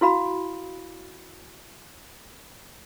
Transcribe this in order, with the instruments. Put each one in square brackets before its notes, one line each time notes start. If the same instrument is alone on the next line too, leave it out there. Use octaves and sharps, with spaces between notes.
[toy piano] E4 F#4 F5 B5